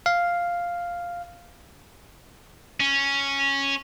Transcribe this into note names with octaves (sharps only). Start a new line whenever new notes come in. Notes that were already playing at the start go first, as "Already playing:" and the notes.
F5
C#4